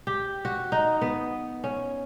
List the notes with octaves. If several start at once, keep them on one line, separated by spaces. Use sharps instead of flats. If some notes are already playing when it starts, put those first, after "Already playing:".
G4
F#4
D#4
B3
C#4